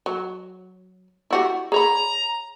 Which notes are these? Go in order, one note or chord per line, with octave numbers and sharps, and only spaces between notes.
F#3
E4 F#4 G4
G#4 C#5 A#5 B5